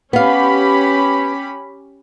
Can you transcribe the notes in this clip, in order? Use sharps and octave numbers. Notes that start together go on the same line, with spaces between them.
B3 C#4 G4 F5 B5